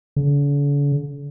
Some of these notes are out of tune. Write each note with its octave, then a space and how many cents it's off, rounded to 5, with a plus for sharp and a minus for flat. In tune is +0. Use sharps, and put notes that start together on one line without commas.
D3 -45